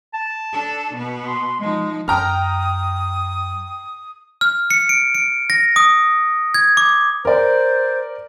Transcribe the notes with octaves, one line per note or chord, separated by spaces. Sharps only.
A5
D4 A4
B2 B3
C6
F3 G#3 D#4
F#2 G5 A#5 D#6 F6
F6
C#7
D7
D7
A#6
D#6
G#6
D6
A#4 C5 D5